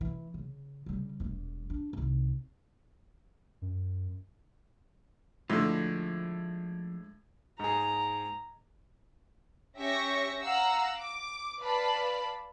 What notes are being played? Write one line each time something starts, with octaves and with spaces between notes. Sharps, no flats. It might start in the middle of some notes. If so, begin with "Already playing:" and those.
E3
C#3
C#3 G3
E1 G3
D4
C2 D#3
F#2
A2 D3 F3 G#3
G#2 G#4 A#5
C#4 G4 E5 C#6 A#6
F5 F#5 A#5 E6
D6
B4 D5 F5 A5 B5